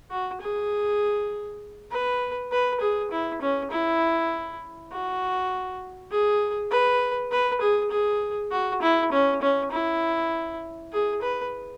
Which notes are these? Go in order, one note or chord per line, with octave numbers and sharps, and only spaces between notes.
F#4
G#4
B4
B4
G#4
E4
C#4
E4
F#4
G#4
B4
B4
G#4
G#4
F#4
E4
C#4
C#4
E4
G#4
B4